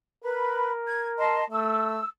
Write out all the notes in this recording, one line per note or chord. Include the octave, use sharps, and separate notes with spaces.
A#4 B4 B5
G#6
D#5 A5 C6
A3 E6